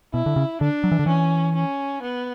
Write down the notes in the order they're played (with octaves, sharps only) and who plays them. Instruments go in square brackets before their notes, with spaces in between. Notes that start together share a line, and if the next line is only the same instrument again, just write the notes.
[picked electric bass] B2 [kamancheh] E4
[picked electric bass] D3
C#3
[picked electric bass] D3 [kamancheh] D4
[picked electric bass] F#3
E3
D3
[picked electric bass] E3 [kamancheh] C#4
[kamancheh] C#4
B3